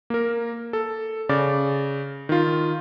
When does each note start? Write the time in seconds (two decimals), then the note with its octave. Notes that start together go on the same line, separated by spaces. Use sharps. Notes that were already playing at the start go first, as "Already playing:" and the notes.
0.10 A#3 A#4
0.73 A4
1.29 C#3 D5 D6 A6
2.29 D#3 F4